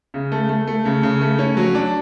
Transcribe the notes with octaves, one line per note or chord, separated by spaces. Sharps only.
C#3
A3
A3
A3
C#3
C#3
A3
C#4
F#3
D4